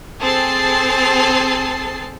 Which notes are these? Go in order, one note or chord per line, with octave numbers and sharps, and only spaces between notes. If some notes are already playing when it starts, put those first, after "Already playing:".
C4 G#4 A4 A6 C7